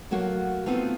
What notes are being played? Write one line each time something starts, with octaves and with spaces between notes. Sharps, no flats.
F#3 A3 A#3 F#4
A3 B3 C4 D#4 F4